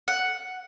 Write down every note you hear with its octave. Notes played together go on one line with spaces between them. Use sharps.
F#5